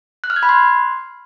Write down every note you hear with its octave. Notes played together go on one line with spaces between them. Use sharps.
F#6
F6
G#6
B5
C6